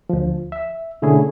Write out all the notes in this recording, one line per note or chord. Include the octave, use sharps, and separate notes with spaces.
D2 F3
E5
B2 D3 A3 C#4 E4 G#4